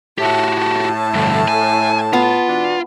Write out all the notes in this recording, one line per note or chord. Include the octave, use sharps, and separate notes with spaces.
A2 F#4 G4 A5
A5
D2 G2
G#5
B3 F4
B2 E3 D4